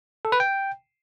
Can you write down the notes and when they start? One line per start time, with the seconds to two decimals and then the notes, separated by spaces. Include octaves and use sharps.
0.25 A4
0.32 B4
0.40 G5